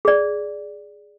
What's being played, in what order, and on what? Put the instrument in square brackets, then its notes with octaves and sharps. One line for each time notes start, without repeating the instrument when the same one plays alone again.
[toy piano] G#4 D5